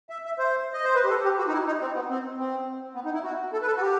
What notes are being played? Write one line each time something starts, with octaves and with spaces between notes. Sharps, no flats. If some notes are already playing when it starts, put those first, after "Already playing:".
E5
E5
C5
D#5
C5
B4
G4
A4
G4
F#4
D#4
E4
D#4
C4
B3
C4
C4
B3
D#4
E4
F#4
A4
B4
A4
F#4
G4